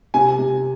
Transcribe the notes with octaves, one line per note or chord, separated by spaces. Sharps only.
C3 G#5
C3